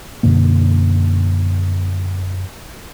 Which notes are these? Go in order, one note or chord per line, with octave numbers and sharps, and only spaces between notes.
F#2 B2 D3 A#3